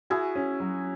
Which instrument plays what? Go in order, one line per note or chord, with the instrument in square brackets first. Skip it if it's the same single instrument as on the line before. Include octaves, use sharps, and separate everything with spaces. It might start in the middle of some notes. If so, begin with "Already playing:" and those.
[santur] E4 G#4 [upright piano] F#4
[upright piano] C#4
F#3